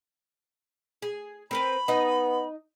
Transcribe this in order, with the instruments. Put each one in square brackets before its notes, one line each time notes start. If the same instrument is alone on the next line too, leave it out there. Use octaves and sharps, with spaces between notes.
[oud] G#4
[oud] C4 A#4 B4 [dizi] B5
[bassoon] B3 [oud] D#4 D#5